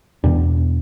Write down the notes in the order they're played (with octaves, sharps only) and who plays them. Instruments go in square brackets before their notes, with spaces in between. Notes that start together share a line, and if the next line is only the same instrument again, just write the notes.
[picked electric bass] E2 B2 D4